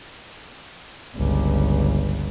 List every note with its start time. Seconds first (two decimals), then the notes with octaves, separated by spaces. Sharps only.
1.16 G1 C#2